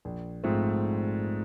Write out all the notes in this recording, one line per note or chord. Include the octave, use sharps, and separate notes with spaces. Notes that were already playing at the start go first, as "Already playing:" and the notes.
A#1
G#2 F3 A3 C4